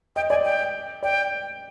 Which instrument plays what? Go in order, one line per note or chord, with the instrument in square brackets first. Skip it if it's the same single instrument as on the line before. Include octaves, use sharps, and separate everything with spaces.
[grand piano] D#5 [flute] G5
[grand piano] D5 [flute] G#5
[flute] G5
[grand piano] D5 [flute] G5